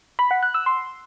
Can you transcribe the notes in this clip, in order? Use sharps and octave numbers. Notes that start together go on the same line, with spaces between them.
B5
F#5
F#6
E6
C6